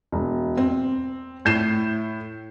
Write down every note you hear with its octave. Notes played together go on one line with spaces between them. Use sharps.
E1
C4
A2 G6 C7 E7